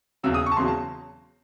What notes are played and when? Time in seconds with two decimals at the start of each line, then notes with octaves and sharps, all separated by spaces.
0.23 E1 E2 C#3 F#3 E6
0.34 D#6
0.46 C#6
0.52 A5
0.57 E1 E2 C#3 F#3 C6
0.68 A5